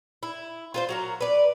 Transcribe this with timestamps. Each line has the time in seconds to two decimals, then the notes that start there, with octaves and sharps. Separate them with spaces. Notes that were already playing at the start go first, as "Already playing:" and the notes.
0.23 E4
0.74 F4 B4 C5
0.89 F#3 F#4 A#4
1.21 B4 D5